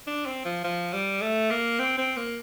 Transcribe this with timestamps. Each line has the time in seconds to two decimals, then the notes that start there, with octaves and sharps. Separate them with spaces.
0.07 D4
0.26 C4
0.45 F3
0.64 F3
0.93 G3
1.21 A3
1.51 A#3
1.79 C4
1.98 C4
2.17 A#3